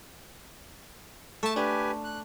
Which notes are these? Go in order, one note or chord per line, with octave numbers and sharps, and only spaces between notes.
A3 E5 A5
D4 G4 B4 G#5
F#6